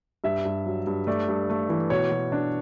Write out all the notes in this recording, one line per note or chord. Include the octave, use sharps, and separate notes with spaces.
G2 E5
G2
F#3
G2
A3 D5
G2
A3
E3
B2 C#5
B2
D4